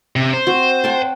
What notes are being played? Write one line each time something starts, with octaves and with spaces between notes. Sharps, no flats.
C3
C5
C4 F#4
F#5 G5 A5